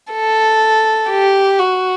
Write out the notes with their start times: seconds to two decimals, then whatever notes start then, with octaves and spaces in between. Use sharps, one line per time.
0.12 A4
1.10 G4
1.60 F#4